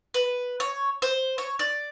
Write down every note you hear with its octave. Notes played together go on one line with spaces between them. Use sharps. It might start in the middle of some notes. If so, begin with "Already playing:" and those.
B4
C#5
C5
C#5
D5